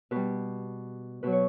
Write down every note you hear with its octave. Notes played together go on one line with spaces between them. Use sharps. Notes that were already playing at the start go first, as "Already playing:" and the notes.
B2 G3 B4
B2 F#3 B4
C#5